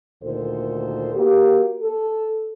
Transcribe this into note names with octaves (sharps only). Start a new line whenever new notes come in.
D2 A#2 D#3 A4 C5
A#3 F#4 G4
A4